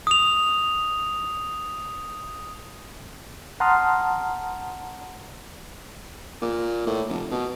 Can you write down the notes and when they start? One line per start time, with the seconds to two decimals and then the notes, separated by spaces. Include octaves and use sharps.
0.07 D#6 F7
3.60 F#5 A5 A#5 C6 D#6 F6
6.42 A#2
6.87 A2
7.09 F1
7.31 B2